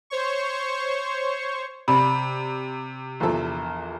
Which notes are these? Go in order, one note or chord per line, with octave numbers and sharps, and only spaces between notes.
C5 C#5 C#6
C3 D5 B5
A#1 E2 A4